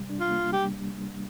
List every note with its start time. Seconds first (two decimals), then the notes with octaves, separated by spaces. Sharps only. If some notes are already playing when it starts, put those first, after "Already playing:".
Already playing: C3 G3
0.09 D4
0.20 F4
0.31 A#3
0.53 G3 G4